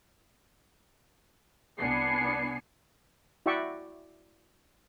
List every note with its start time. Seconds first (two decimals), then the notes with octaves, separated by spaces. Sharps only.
1.79 C2 B3 D4 G#5 C7 C#7
3.46 E4 F#4 D5 E5 G5 C#6